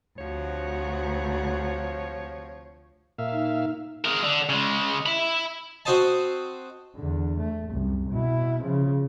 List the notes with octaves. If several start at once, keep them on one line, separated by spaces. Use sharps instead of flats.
D2 C3 F3 F#4 C#5
A#2 E5 F5
D#4
G#3 A#4
D3
C#3 G#3
E5 B5
C4 F#4 C5 D#5 A5
E2 D3
A3
C2 F#2
B2 E4
C#3 F3